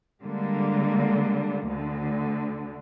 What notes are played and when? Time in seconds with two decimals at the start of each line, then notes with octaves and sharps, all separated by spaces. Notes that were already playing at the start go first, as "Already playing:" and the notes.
0.23 D3 G3 G#3 A#3
1.66 D2 D3